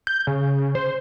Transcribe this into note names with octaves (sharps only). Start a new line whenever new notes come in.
G6
C#3
C5